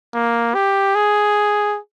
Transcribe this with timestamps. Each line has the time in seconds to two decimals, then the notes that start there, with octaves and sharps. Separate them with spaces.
0.14 A#3
0.54 G4
0.95 G#4